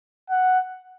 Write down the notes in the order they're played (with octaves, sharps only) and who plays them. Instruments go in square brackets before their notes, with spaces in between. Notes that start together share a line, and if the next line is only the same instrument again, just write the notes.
[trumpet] F#5